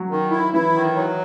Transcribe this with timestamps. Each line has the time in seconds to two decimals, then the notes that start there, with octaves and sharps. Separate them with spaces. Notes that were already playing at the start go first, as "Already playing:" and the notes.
Already playing: F#3
0.10 D#3
0.31 E4
0.53 E3 E4
0.74 D#3
0.96 F#3